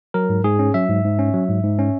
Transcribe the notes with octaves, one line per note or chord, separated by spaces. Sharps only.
F#3 A#4
G#2
G#2 G#4
C#4
F#3 E5
G#2
G#2
C#4
F#3
G#2
G#2
C#4